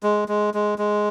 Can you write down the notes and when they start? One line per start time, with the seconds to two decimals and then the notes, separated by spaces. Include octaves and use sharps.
0.03 G#3
0.28 G#3
0.54 G#3
0.78 G#3